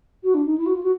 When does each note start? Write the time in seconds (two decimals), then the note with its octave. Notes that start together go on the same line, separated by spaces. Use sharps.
0.24 F#4
0.34 D4
0.46 D#4
0.58 E4
0.66 F#4
0.74 F4
0.83 F#4